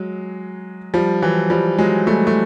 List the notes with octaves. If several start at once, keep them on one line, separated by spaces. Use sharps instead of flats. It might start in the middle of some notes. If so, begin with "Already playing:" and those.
Already playing: F#3 G#3
F3 G3
E3 F#3
F3 G3
F#3 G#3
G3 A3
A3